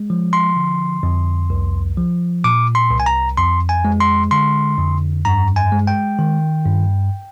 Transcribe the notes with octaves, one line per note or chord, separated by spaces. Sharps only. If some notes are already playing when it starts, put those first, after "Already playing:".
Already playing: G#3
F3
C6
D3
F2
C2
F3
A#2 D6
C6
C2
G#5
A#5
F2 C6
G#5
G#3
C6
D3 C6
F2
G2 A#5
G#5
G#3
G5
D#3
G2